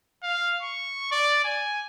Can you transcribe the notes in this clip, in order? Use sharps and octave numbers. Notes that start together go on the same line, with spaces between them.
F5
C#6
D5
G#5